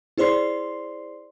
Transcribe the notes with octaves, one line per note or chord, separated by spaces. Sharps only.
E4 G#4 C5 D5 C6 C7